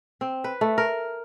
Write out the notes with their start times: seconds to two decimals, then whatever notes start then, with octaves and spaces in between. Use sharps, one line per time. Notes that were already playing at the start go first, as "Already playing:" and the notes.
0.21 C4
0.44 B4
0.61 A3
0.78 A#4